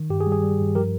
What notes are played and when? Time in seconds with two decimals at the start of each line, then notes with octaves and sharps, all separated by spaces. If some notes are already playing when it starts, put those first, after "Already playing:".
Already playing: D#3
0.10 G2 G4
0.20 G#4
0.27 G3
0.32 G#4
0.43 G3
0.60 G2
0.75 F3 G4 A#4